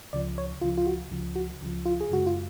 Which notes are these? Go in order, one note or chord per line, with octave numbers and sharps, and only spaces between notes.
C#2 C#3 F3 D5
C#5
C#2 C#3 F3 F4
F4
F#4
C#2 C#3 F3
F#4
C#2 C#3 F3
F4
G#4
F#2 C#3 G#3 F#4
F4